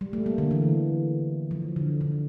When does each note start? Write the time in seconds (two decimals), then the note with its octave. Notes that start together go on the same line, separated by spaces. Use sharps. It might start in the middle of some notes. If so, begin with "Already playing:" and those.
0.01 G3
0.13 A3
0.26 A#3
0.38 D3
0.51 E3
1.51 F3
1.76 D3
2.01 D3